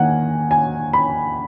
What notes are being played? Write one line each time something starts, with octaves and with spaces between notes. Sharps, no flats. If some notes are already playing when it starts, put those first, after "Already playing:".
Already playing: D#3 A#3 F#5 G#5
G#5
B5